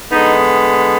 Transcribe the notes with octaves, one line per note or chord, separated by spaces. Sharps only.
D3 G#3 B3 D#4